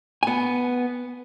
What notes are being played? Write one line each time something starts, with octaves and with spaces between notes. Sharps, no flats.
B3 G#5